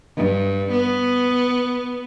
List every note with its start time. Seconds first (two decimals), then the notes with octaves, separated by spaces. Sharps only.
0.17 G2
0.72 B3